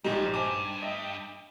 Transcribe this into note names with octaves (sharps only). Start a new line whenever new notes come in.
A#1 G#2 G3 D#4
G2 C5 G#5 D6
D#5 E5